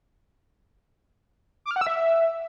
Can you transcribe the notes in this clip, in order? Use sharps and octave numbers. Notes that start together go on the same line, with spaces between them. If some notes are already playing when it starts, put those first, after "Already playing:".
D6
F6
F#5
E6
E5